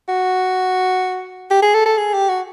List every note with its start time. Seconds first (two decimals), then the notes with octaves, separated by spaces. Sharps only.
0.09 F#4
1.51 G4
1.63 G#4
1.74 A4
1.86 A4
1.98 G#4
2.14 G4
2.29 F#4